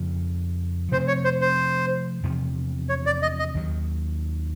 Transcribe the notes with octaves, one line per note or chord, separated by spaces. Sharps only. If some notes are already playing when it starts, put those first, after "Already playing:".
Already playing: F2 C#3 F3
C3 F3 A3 C4 C5
C#5
C5
C5
E2 C3 F3
C#5
D5
D#5
D#5
D#2 D#3 F#3